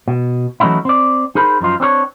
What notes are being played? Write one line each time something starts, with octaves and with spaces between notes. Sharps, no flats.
B2
E3 F#3 A3 C#4 D#4 E4
C4 D5
D#4 G#4 A#4 C5 B5
F#2 F3 D#4 F4
C4 D4 A4 C#5